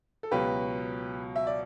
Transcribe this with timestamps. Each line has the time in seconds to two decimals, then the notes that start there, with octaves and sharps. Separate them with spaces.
0.23 A4
0.31 C#2 B2 F#3 G4 B4
1.36 E5
1.47 D5